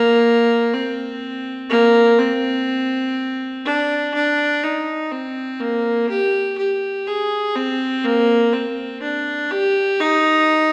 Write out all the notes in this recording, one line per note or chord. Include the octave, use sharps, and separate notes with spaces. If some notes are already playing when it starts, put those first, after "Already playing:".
Already playing: A#3
C4
A#3
C4
D4
D4
D#4
C4
A#3
G4
G4
G#4
C4
A#3
C4
D4
G4
D#4